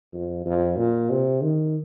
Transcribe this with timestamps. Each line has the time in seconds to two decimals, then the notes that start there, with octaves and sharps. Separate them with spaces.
0.14 F2
0.46 F2
0.77 A#2
1.10 C3
1.42 D#3